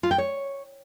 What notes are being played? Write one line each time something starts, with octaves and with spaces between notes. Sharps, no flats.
F4
G5
C#5